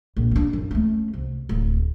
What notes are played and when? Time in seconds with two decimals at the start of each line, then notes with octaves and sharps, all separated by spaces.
0.17 A#1
0.32 C4 D4
0.53 F#2
0.71 A3 C#4
1.14 C2
1.49 D1